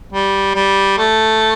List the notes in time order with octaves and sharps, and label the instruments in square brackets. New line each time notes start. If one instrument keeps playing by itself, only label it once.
[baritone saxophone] G3
G3
A3